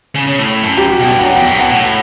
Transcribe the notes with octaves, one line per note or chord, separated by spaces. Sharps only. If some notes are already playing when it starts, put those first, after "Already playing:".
C#3
C#3
A2
F#2
G4
F#4
B2 G4
G2
F#5
F#2
E2 G5
F#2
B2 F#5
A2
F#5